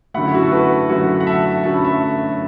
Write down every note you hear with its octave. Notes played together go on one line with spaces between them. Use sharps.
F#2 D3 F#3 A3 F#5 B5
E4
F#4
A4
F#4 B4
F#2 D3 F#3 A3 F#4
F#5
E5 A5
F#2 D3 F#3 A3 A5
B5
E5 A5